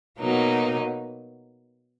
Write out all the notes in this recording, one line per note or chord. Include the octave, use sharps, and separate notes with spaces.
B2 F#3 A#3 D#4